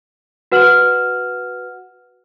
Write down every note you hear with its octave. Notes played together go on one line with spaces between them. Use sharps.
F#4 B4 F#5 F6 E7 F#7